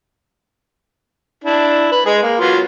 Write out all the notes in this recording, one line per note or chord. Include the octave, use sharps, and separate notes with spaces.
D4 E4
B4
G#3 G#4
A#3
F#3 B3 F4